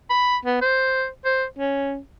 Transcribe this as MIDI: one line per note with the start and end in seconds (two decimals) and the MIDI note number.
0.10 0.37 83
0.45 0.59 59
0.62 1.08 72
1.25 1.45 72
1.59 1.99 61